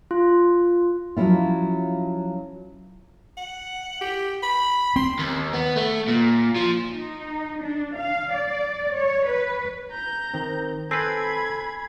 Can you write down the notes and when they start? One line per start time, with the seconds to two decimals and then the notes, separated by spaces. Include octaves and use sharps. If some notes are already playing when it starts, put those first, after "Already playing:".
0.11 F4
1.17 F3 F#3 C#4 E4 F4
3.37 F#5
4.01 G4
4.43 B5
4.96 C4 C6
5.19 D#2
5.54 B3
5.77 A3
6.08 A#2
6.56 F3
6.91 D#4
7.62 D4
7.99 F5
8.34 D5
8.96 C#5
9.27 B4
9.91 A#5 G6
10.34 D#3 C4
10.91 C4 A4 B4 G#5 B5 G#6 C7